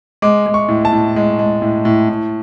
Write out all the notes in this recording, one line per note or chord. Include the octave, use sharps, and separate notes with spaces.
G#3 D6
G#3
C#6
A2
A5
A2
G#3
G#3
A2
A2
A2